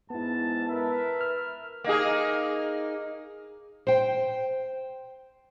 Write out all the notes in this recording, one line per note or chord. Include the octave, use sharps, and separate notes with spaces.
G#2 B3 E4 A5
A#4 B4 E5
F6
A#3 D#4 G#4
C5 G5